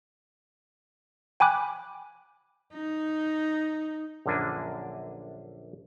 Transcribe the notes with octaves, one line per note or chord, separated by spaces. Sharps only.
G5 G#5 B5 D6 F#6
D#4
A#1 F#2 D3 A#3 D4 G#5